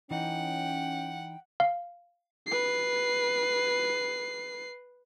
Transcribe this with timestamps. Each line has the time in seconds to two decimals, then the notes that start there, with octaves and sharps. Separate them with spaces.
0.11 E3 C#4 D#4 F#5 G5
1.60 F5
2.47 B4 C7